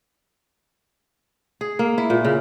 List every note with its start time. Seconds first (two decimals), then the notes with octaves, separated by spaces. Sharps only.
1.61 G#4
1.79 A#3
1.98 E4
2.10 A#2
2.25 C#3